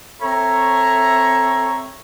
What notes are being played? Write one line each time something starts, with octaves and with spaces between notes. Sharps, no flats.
C4 A4 C#5 E5 A#5